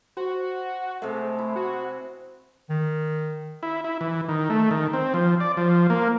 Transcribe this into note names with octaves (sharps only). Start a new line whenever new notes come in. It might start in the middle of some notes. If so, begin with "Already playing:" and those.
F#4 C5
C3 G#3 A3
E4
F#4
D#3
E4
E4
E3
D#3
A3
D#3
C4
F3
D5
F3
A#3